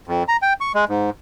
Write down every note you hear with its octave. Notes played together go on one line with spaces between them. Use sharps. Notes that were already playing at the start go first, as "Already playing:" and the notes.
F2
A#5
G5
C#6
G#3
G#2